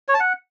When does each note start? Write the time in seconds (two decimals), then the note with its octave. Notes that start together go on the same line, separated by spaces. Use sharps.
0.08 C#5
0.14 A5
0.20 F#5